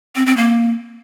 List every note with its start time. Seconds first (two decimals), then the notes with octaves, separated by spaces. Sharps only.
0.16 C4
0.26 C4
0.37 A#3